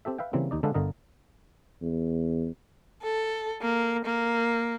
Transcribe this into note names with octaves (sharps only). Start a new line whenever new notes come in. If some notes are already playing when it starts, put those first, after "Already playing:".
C4 G4 A4 E5
B4 E5 F5 G5
C#3 E3 G3 A#3 C4
D#2 D#4 D5
D3 G#3 D4 A4 B4 F5
G1 D3 A#4 D#5
E2
A4
A#3
A#3